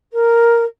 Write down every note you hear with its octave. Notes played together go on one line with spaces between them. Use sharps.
A#4